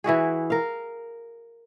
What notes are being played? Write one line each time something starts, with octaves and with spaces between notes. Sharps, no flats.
E3 E4 F#4 G#4
A#4 F5